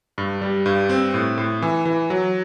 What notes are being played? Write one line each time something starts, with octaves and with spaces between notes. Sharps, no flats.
G2
G3
G2
C4
A2
A2
E3
E3
F#3